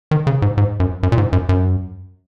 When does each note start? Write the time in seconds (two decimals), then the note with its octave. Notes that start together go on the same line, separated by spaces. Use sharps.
0.11 D#3
0.27 C#3
0.42 G#2
0.57 G#2
0.80 F#2
1.03 F#2
1.12 A#2
1.18 G#2
1.33 F#2
1.49 F#2